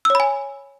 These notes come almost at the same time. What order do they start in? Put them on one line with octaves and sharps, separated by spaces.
E6 C#5 B5 G#5